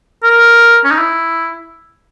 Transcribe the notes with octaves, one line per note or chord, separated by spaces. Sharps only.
A#4
C#4
D#4
E4